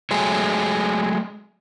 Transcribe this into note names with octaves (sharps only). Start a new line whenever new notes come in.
F#3 G#3 A3 G#4